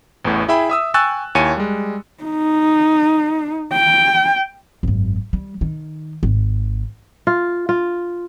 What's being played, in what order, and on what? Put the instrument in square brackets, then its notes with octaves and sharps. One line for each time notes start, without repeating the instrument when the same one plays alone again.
[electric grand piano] A1 E2 A2
E4 G#4 E5 G5 B5
E5 D#6 E6
G5 G#5 C#6 E6 F#6 A6
D#2 E4 C#5 G#5 C#7 D#7
G3 G#3
[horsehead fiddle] D#4
G5
[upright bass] G#1 F#2
G3
D#3
G#1
[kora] F4
F4